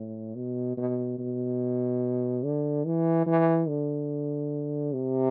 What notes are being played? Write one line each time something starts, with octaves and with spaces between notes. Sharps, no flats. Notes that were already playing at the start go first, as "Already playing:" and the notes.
Already playing: A2
B2
B2
B2
D3
E3
E3
D3
C3